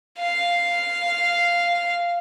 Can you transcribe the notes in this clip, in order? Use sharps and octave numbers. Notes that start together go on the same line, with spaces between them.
F5